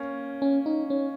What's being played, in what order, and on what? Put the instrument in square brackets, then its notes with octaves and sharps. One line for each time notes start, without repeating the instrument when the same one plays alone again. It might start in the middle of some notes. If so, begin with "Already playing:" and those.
Already playing: [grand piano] A#3 C#4
[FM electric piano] C#4
D#4
C#4